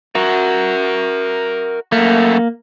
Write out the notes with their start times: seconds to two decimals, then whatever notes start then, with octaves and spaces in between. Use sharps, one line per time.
0.15 F#4 A#4 E5
1.92 F#2 A3 A#3